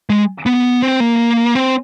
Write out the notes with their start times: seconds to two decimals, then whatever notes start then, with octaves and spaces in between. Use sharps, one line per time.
0.10 G#3
0.46 B3
0.82 C4
1.00 A#3
1.55 C4